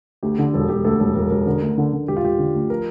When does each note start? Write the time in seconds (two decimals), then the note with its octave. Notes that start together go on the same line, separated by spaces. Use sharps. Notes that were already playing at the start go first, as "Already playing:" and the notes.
0.23 D2 G4
0.38 D3 A4
0.54 E1 A4
0.69 E1 G4
0.85 D2 A4
1.00 E1 A4
1.15 E1 A#4
1.30 E1 A#4
1.46 D3 A#4
1.62 D2
1.78 D3
1.93 D3
2.08 E1 G4
2.17 F4
2.23 E1 G4
2.39 D3
2.54 D2
2.70 F3 A#4